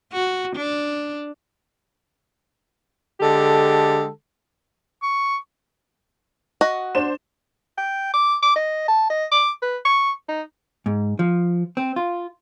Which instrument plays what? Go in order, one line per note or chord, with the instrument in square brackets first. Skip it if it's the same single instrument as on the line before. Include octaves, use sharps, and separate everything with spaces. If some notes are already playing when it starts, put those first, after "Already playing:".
[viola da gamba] F#4
D4
[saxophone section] D3 G#3 G4 A4
[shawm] C#6
[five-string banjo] F#4 D#5
[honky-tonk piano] D4 C5 E7
[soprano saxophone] G5
D6
D6
D#5
A5
D#5
D6
B4
C#6
D#4
[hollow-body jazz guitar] G#2
F3
C4
F4